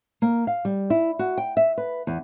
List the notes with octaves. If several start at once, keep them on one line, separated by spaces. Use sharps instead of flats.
A#3
F5
G3
E4
F#4
G5
E5
B4
E2